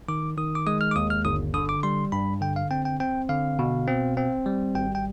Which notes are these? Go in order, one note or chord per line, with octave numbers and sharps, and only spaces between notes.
D#3 D6
D#3 D#6
D6
G#3 D#6
F6
D6
D#2 D#6
F6
G1 D#6
D3 D#6
D6
G3 C6
G2 B5
D3 G5
F5
C4 G5
G5
C4 G5
D3 F5
B2
C4
C4
G3
G#1 G5
G5